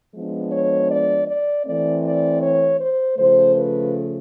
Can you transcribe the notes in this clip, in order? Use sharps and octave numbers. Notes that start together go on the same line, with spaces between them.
F3 G#3 B3 D4
C#5
D5
D5
E3 A3 C4 D5
D5
C#5
C5
C#3 F3 A3 C5
B4